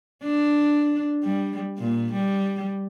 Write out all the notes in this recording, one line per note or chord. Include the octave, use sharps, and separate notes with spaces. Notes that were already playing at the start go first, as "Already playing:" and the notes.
D4
G3
A#2
G3